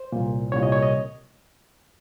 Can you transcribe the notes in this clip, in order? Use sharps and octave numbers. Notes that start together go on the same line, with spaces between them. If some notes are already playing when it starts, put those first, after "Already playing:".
Already playing: C5
C2 A#2
C2 A#2 C#5
D#5
C#5
D#5